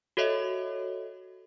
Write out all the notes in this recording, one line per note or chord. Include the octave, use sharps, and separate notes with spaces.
F#4 A4 C#5 D#5 E5